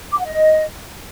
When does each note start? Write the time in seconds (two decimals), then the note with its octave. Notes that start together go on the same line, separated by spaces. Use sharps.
0.12 D6
0.19 F#5
0.25 D#5